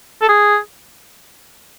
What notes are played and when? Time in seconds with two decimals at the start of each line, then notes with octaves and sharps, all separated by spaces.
0.22 A4
0.28 G#4